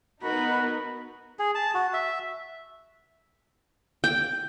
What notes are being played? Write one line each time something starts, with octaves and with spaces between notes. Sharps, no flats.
B3 D#4 F#4 A#4 B5
G#4
A5
F#4
E5
G5